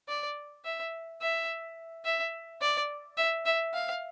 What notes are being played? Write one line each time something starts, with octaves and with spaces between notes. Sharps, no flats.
D5
E5
E5
E5
D5
E5
E5
F5